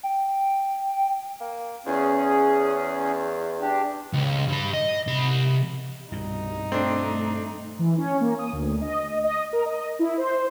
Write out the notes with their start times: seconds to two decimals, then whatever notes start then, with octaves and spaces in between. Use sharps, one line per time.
0.03 G5
1.41 A#3
1.86 E2 C#4 G#4
3.61 D4 G4
4.13 C#2
4.49 G2 B5
4.74 D#5
5.07 C3 B5
6.12 C2 G2 B2 D#3 D#4
6.72 A3 C4 D4
7.79 E3
7.98 C#4
8.21 A#3
8.39 D#6
8.53 D2
8.81 D#5
9.24 D#5
9.53 A#4
9.66 D#5
9.99 E4
10.18 C5